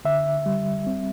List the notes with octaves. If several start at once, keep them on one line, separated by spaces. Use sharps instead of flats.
D3 E5
G3
C4